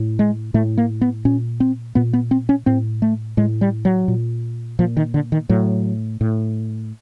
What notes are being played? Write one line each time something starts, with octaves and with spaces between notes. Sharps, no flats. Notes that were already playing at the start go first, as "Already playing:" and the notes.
Already playing: A2
G#3
A2 A3
A#3
B3
A#2 C#4
C4
A#2 B3
B3
C4
C#4
A2 C4
A3
A2 G#3
G3
F#3
A#2
A#2 F3
D#3
D3
D#3
A2 F#3
A2